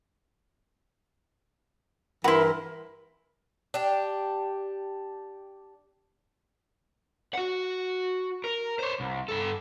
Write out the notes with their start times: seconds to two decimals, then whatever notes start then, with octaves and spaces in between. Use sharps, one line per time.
2.24 G2 E3 E4 F#4 A#4 B5 C6
3.74 D4 G4
7.34 F#4 F#5
8.44 A#4
8.79 C5 C#5
9.00 C2
9.28 G2 A4